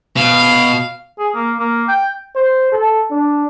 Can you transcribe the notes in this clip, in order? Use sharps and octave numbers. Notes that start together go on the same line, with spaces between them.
B2 F5
G#4
A#3
A#3
G5
C5
A4
D4